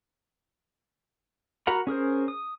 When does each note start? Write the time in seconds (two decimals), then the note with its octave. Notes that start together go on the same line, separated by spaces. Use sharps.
1.67 F#4 A#4 F#5 A#5 B5
1.87 C#4 G#4 A#4 C5
2.28 D#6